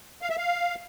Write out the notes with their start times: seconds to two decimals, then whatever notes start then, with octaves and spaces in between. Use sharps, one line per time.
0.22 F5
0.30 E5
0.37 F5